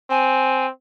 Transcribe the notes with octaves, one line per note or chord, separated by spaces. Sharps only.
C4 G#5